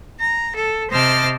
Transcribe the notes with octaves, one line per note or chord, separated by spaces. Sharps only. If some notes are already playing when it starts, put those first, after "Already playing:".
A#5
A4
C3 C5 D#5 A5 D6 F6